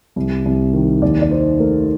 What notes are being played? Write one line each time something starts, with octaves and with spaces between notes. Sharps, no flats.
C2
C2
D#3
D#2 D5
D5
D#4 C5
A3 A#4